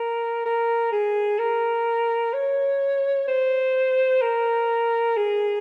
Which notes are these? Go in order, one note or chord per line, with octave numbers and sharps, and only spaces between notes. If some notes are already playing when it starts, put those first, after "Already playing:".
Already playing: A#4
A#4
G#4
A#4
C#5
C5
A#4
G#4